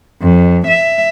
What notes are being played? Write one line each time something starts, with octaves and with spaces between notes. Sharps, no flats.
F2
E5